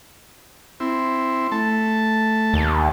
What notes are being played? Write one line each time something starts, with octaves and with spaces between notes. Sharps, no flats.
C4 E4
A3 A5
D#2